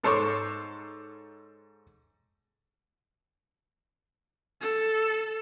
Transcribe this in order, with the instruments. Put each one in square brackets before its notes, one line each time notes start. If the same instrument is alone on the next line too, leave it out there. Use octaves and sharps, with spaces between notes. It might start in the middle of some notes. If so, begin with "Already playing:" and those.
[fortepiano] G#2 A4 C5 C#5 C#6 D6
[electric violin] A4